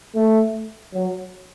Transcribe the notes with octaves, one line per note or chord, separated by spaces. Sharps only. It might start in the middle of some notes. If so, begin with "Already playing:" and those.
A3
F#3